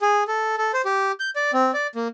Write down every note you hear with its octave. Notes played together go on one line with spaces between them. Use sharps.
G#4
A4
A4
C5
G4
G6
D5
C4
D5
A#3